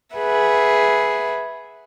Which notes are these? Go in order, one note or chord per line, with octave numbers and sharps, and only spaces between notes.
G#4 B4 E5 F#5